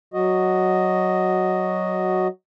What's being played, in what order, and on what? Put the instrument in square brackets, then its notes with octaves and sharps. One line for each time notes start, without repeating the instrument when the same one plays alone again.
[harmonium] F#3 F#4 D#5